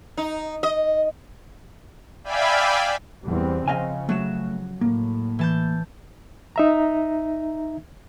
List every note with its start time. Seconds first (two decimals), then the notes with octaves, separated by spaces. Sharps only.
0.17 D#4
0.63 D#5
2.24 D5 E5 F5 G5 G#5 B5
3.26 E2 G3 C4
3.68 C#3 F3 D#5 F5 G#5
4.09 F#3 A3 F#4 E7
4.81 A2 A#3
5.39 E3 A5 G6
6.56 D#4 E5 A#5